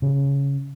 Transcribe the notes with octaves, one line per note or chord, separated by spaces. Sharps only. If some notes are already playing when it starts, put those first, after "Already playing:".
C#3